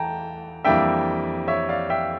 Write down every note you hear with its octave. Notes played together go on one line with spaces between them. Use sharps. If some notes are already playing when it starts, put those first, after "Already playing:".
Already playing: E2 E3 A3 G5 A5 A#5
F2 E3 G3 A#3 D4 E5 G5
C#5 E5
D5 F5
E5 G5